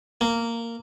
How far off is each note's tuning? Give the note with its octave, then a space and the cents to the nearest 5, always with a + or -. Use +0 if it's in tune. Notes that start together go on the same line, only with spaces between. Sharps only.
A#3 -10